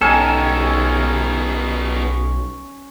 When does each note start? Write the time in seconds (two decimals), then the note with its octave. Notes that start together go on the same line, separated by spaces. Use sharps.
0.01 B1 B3 C#4 D#4 G4 A4 G#5